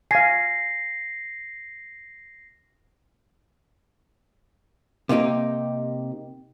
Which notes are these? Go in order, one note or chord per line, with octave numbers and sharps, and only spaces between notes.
F5 G#5 A#6 C7
C3 A#3 D#4 G4